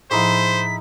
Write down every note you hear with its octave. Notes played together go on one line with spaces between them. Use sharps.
A2 F3 D#4 E4 G#4 C5 B6